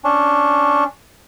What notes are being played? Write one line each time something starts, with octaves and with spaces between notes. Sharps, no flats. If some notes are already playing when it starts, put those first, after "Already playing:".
C#4 D4